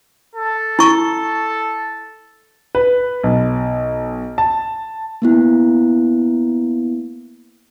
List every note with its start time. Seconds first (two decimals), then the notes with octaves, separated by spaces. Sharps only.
0.35 A4
0.79 E4 C#6
2.75 B4
3.23 B1
4.38 A5
5.22 A#3 B3 E4